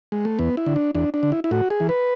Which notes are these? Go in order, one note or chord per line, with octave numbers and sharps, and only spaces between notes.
G#3
A3
E2 B3
E4
D3
D4
E2 D4
D4
D3
E4
E4
A2 F#4
G#4
E3
B4